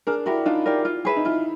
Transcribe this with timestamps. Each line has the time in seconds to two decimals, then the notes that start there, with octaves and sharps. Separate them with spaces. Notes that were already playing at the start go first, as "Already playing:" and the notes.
0.07 D4 G#4 A#4
0.26 E4 F#4 G4 A#4 D5
0.45 D4 D#4 F4
0.66 G4 A#4 D5
0.85 F4
1.05 G#4 B4 E5
1.16 D#4
1.25 E4 F4